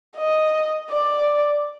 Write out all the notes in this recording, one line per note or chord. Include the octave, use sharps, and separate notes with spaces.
D#5
D5